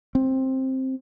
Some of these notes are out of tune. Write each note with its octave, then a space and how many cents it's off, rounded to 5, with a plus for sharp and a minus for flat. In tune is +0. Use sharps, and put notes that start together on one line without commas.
C4 +10